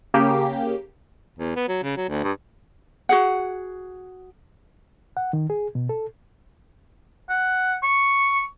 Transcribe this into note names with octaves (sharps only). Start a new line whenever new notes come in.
C#3 A#3 G4
E2
B3
F#3
C#3
F#3
D2
G2
F#4 G#4 F#5
F#5
D#3
G#4
B2
A4
F#5
C#6